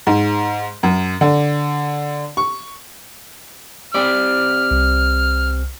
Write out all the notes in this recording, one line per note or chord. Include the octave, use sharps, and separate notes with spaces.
G#2
F#2
D3
C#6
C4 G4 D5 F6
C2